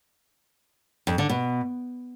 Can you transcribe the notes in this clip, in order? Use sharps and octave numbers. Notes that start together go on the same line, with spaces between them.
F2
D3
B2